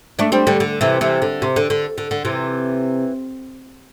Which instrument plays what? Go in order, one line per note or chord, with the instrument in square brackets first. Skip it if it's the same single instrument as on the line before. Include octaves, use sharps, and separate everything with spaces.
[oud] A3 D4
G3 C4
D3 G3
D3
C3 E3
C3 E3
D3
C3
D3
D3
D3
D3
C3 E3